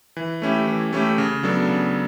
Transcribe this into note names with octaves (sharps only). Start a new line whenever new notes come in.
E3
A3 C#4 E4 G4
E3
A3 C#4 E4 G4
C#3
F#3 B3 D4 A4
C#3